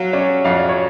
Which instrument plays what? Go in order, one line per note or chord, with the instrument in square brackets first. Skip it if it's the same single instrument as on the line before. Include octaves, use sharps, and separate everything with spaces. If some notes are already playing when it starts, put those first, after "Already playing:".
Already playing: [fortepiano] F#3 [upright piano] F5
[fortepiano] C#4 [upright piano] D5
[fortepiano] F2 [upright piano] F5
[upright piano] D5
C#5